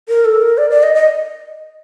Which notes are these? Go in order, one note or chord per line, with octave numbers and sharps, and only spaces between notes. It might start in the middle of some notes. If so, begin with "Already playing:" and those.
A#4
A4
A#4
D5
D5
D#5
D#5